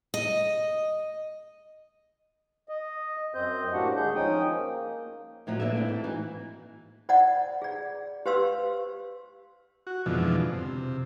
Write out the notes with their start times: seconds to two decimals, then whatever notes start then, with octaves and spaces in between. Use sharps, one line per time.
0.14 D#5
2.69 D#5
3.35 F#2 C4 C5 D#5 G6
3.73 A2 A#3 D4 F#4 G4 F#5
3.96 D#2 G#3 G#4 G6
4.15 F3 C#4 D#4 G5 D#6
4.47 A#3
5.47 A2 F3 F#3 D#4
5.60 A#2 D3 B4 E5
5.74 A2 C4 E4
5.89 G#2
6.04 E3 D#4 F#4
7.09 C5 D5 D#5 F#5
7.62 G#4 D5
8.26 G4 B4 C5 F5 C6 E6
9.87 F#4
10.06 F2 G#2 B2 D3 E3 F3
10.53 C3